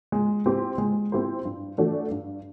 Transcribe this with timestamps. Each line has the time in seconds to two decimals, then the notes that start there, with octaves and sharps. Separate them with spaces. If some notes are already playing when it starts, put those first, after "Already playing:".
0.12 G#3
0.46 C4 E4 G4 C5
0.78 G#3
1.12 C4 E4 G4 C5
1.45 G2
1.78 E3 A3 D4 F#4
2.11 G2